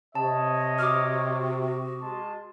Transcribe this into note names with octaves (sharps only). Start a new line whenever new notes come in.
C3 C#5 D#5 A5
F#4 D6 D#6 F6
G#3 A5 C6